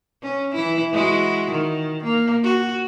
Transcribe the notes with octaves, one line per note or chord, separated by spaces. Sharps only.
C#4
E3 E4
G#3 E4 F#4
D#3
A#3
F#4